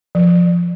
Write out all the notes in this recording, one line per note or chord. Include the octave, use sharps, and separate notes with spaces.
F3